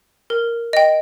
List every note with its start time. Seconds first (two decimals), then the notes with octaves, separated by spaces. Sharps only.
0.30 A#4
0.73 D#5 G5